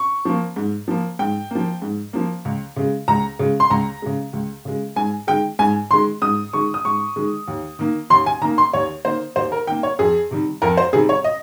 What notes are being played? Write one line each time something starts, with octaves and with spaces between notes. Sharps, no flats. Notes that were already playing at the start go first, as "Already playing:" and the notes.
Already playing: C#6
F3 A#3
G#2
F3 A#3
G#2 G5
F3 A#3
G#2
F3 A#3
C#2
C#3 G#3
C#2 A#5
C#3 G#3
C6
C#2 A#5
C#3 G#3
C#2
C#3 G#3
G#2 G#5
D#3 G#3 G5
G#2 G#5
D#3 G#3 C6
G#2 D#6
D#3 G#3 C#6
D#6
G#2 C#6
D#3 G#3
D#2
D#3 A#3
D#2 C6
G#5
D#3 A#3 A#5
C6
D#2 C#5
D#3 A#3 C5
D#2 C5
A#4
D#3 A#3 G5
C#5
F2 G#4
C3 D#3 G3
F2 A#4
C5
C3 D#3 G3 G#4
C#5
D#5